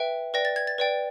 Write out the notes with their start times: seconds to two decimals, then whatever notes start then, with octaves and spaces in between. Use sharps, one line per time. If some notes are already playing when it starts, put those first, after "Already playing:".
Already playing: B4 E5 G5
0.34 B4 D5 G5 A#6
0.45 A6
0.56 G#6
0.67 A6
0.78 B4 D5 G5